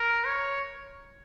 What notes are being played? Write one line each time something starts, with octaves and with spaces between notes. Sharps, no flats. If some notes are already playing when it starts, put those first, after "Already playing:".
Already playing: A#4
C#5